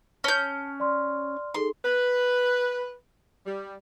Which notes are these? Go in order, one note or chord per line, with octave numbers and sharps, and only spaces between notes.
C#4 A5 F6 G6
D5 C6 F6
D#4 G#4 A4 C6
B4
G3